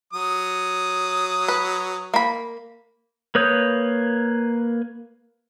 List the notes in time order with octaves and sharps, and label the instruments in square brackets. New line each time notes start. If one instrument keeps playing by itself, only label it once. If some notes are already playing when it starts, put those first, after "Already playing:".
[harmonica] F#3 D#6
[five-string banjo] B4
A#3 B5
[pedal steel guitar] A#3 B4 C#5 D#6 G6